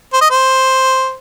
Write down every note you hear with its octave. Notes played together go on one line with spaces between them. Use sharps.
C5
D#5
C5